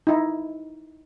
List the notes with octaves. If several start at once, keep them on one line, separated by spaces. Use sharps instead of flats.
D#4 E4